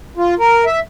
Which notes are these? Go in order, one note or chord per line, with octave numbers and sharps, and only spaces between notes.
F4
A#4
E5